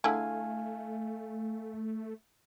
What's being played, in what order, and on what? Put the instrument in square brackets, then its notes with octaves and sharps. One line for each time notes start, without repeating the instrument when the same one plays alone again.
[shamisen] D3 E4 G#4 [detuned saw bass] A3 [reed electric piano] F5 G#5